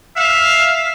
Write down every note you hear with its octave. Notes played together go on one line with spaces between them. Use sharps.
E5 F5